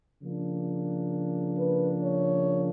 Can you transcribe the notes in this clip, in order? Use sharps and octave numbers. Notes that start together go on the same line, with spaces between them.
C#3 F3 A#3 D4
B4
C#5